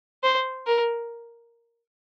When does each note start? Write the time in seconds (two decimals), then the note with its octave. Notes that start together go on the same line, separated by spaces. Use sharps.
0.24 C5
0.67 A#4